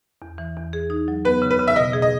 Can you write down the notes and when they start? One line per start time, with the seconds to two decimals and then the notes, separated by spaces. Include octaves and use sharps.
0.22 E2
0.38 E3
0.57 E2
0.73 G#4
0.90 D#4
1.08 F#3
1.25 B3 B4
1.42 C#3
1.51 B4
1.59 C#3
1.68 E5
1.76 B2 D#5
1.93 G#4
2.02 D#5